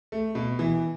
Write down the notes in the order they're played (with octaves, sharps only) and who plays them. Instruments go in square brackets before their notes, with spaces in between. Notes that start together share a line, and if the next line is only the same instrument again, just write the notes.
[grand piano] A3
B2
E3